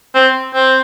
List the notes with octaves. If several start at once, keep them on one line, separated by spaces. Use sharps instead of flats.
C4
C4